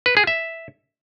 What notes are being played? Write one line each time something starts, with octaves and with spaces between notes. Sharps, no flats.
B4
G#4
E5